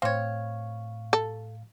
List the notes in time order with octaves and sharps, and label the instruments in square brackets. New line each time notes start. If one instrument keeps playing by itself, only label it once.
[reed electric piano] A2 F5 [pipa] C4 C#5
[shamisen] A4